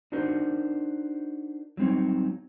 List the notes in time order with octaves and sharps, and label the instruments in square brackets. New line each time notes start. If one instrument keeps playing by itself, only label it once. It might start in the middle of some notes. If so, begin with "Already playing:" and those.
[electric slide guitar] D4 D#4 F#4 A#4 C5
F#3 G3 C4 D#4 C#5